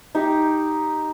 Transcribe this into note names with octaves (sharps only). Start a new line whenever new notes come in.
D#4 G4